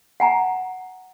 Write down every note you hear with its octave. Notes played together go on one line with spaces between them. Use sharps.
F#5 G#5 A#5